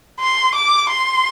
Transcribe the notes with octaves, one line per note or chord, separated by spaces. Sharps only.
C6
D6
C6